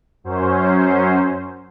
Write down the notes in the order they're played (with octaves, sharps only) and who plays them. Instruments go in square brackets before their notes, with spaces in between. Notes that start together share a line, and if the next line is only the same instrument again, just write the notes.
[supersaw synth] F#2 F#3 C#4 C5